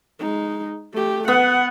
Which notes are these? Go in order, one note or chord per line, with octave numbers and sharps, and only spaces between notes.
G#3 D#4
A3 G4
B3 F#5